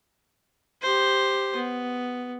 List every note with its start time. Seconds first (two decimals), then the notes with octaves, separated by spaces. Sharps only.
0.82 G4 C5
1.56 B3